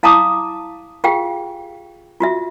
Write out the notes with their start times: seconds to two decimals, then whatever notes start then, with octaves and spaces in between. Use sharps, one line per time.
0.03 E4 F5 A5 A#5 D6 D#6
1.04 F4 G4 G#4 F5 G5
2.20 F4 F#4 E5